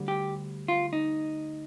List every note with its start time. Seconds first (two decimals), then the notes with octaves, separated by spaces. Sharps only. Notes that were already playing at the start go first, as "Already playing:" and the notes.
Already playing: D2 D3 G3
0.08 G4
0.68 F4
0.93 D#4